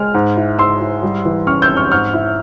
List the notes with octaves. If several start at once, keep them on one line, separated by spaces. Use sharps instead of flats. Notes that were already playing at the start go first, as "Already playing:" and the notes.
Already playing: G#3 F6
G#2
E4
G#2 C6 E6
E4
G3
E3
C#4 C#6 F6
E6 G6
F2
C#6 F6
G#2 C#6 F6
E4